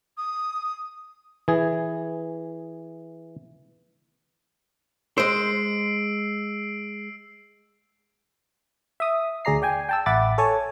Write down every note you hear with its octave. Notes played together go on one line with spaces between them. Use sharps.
D#6
E3 G#4
G#3 C5 E6 C7 D7
E5 D#6
D2 G#4 D5 A#5 C7
D5 G5 G#5
G5 A5 E6
A1 E5 F#5 B5 D6 A6
A4 C#5 G#5 A5